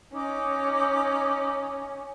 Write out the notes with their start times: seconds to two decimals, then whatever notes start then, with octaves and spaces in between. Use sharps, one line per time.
0.13 C#4 D#4 D6